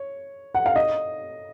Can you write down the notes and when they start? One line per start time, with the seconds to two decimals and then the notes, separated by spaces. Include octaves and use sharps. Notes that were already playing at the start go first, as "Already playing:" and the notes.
Already playing: C#5
0.55 F#5
0.66 F5
0.76 D#5